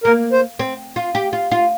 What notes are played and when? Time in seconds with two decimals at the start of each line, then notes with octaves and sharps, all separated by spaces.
0.04 A#3 A#4
0.32 C5
0.59 C4
0.96 F4
1.15 G4
1.33 F4
1.51 F4